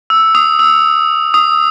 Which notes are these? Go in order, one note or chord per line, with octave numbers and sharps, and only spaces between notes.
E6
D#6
E6
D#6